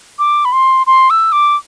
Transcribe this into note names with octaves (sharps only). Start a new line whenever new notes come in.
D6
B5
C6
C6
E6
D6